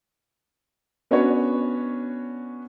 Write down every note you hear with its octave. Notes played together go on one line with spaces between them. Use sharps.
B3 C#4 D4 F#4 B4 C#5